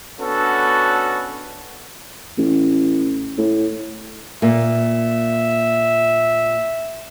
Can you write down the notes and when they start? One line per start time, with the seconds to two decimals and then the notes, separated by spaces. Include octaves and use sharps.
0.20 B3 C#4 D4 F#4 A4
2.38 A1
3.38 A2
4.42 A#2 A#3 E5